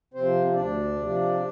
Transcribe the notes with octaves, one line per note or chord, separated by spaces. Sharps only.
C3 F3 C4 C5
D2 D4 D5
C3 F3